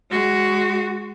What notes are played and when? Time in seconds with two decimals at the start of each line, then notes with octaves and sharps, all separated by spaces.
0.11 G#3 F#4